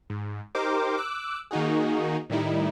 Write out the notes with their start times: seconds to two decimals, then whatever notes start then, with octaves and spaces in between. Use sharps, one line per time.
0.10 G#2
0.55 D#4 G4 A#4 C5 D6
0.97 D6 E6 F#6
1.51 D#3 A#3 D#4 F#4 G#4
2.30 A2 D#3 G3 D#4 E4